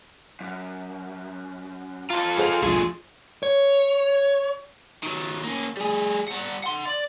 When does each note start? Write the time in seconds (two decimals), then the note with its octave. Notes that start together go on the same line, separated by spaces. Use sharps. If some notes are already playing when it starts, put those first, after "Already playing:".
0.41 F#2
2.10 F4 A4 A#5 C6
2.37 G#4 C5 F7
2.62 B1 E2 F3 A3 D4 G#4
3.43 C#5
5.03 D#3 F#3
5.44 A#3 C#4
5.77 G3 G#4
6.28 G3 F#5
6.64 F#5 C6
6.86 D5